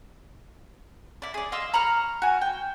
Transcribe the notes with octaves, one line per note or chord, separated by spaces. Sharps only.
E4 D5
G#4 D5
D#5 F5 C6 E6
A#5 B5 C#6 F6
F#4 G#5
G5